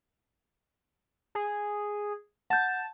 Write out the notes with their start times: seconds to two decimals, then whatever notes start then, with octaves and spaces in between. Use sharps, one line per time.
1.35 G#4
2.50 F#5 A5 G6